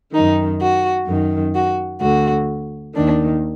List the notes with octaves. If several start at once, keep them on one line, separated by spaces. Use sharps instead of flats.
F#2 D#3 D#4
F#4
F#2 D#3
F#4
D2 D3 F#4
D#2 D#3 D4